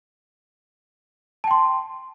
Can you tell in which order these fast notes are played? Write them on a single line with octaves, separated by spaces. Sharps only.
A5 G5 C6